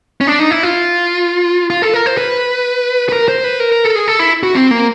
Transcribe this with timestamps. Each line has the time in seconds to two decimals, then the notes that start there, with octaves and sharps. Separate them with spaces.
0.21 C#4
0.27 D4
0.39 D#4
0.51 E4
0.63 F4
1.70 F4
1.82 A4
1.94 A#4
2.06 C5
2.17 B4
3.09 B4
3.13 A#4
3.28 C5
3.44 B4
3.60 A#4
3.72 A#4
3.84 A4
3.95 G#4
4.08 A4
4.19 E4
4.43 F#4
4.55 C4
4.71 A#3